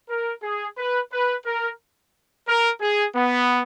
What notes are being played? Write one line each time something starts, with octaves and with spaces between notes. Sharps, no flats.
A#4
G#4
B4
B4
A#4
A#4
G#4
B3